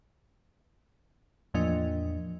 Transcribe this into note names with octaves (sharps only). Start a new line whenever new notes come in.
E2 A2 F3 A#3 D4 D#5